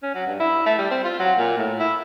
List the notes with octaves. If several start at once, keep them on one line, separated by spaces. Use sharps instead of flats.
C#4
F#3
G2
E4
A3
G3
C4
F4
F#3
A#2
A2
E4